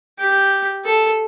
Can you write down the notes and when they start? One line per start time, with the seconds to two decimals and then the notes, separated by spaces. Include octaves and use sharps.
0.18 G4
0.84 A4